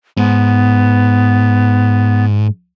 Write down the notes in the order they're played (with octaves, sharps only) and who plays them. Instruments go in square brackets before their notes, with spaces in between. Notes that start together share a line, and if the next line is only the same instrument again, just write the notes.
[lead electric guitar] G#2 [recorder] B3